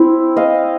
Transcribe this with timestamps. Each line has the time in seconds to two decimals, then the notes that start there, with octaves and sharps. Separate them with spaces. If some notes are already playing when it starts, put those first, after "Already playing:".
Already playing: C4 E4
0.36 D#5 F5